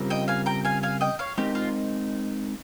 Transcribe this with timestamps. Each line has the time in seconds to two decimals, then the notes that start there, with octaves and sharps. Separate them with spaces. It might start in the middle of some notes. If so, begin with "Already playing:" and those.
Already playing: C#3 G3 C4 F4 A#4
0.10 D#5 G5
0.28 F5 G#5
0.46 G5 A#5
0.65 F5 G#5
0.83 F5 G#5
1.01 D#5 G5
1.19 C#5 F5
1.38 G#3 C4 D#4 G4 A#4
1.55 F4